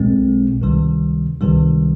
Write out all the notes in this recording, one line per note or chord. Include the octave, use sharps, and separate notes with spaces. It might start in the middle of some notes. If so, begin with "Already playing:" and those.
Already playing: B1 B2 G#3 C4
C#2 C3 D#3 G3
C#2 C3 D#3 G3